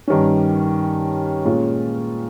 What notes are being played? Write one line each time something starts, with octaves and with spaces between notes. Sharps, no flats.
G2 D#3 G3 C#4
A#2 G#3 C#4 F4